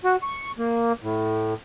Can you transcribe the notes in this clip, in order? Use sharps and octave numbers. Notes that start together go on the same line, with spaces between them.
F#4
C#6
A#3
A2